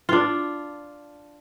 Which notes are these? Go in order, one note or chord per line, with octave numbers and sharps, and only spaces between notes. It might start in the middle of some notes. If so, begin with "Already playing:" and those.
D4 F4